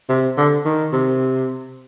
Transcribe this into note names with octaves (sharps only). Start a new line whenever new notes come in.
C3
D3
D#3
C3